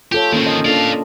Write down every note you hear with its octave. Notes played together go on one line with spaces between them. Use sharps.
F4 G4 A4 C#5
D#3 A#3 C4 C#4
D#5
D4 F4 A4 D5 F5